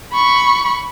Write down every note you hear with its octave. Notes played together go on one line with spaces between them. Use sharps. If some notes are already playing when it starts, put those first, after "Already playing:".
B5 C#6